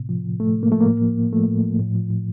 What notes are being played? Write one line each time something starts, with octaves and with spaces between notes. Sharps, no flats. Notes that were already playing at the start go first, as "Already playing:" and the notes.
Already playing: A2 C3
F3
A2
A2 A3
A2
A#3
F3 A3
A#3
A2
F3
A2
F3 A3
A2
F3
A2
F3
A2